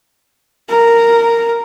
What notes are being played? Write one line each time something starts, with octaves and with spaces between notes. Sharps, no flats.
A#4